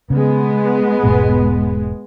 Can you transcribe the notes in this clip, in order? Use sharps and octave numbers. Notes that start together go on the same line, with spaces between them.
C#3 G#3 B3
E1 G#2 B2